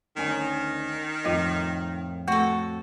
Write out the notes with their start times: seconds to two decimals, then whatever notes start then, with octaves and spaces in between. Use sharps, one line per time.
0.17 D2 D#3 C#4 G#5
1.24 F2 A2 C4 F4 D#5
2.28 A3 F#4 A4